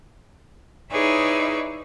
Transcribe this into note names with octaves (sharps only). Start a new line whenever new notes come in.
D#4 E4 G#4 B4 C#5 D5